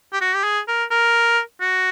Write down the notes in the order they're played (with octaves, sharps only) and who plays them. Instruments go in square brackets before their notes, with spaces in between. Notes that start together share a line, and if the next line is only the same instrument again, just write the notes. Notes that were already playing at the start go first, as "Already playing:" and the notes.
[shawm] G4
F#4
G4
G#4
A#4
A#4
F#4